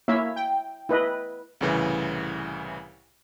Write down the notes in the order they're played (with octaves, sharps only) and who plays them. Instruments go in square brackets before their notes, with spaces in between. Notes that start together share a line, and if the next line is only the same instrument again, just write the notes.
[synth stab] A#3 [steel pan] E4 C#5 E5
[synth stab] G5
[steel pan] E4 B4 D#5
[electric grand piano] C2 A2 C#3 E3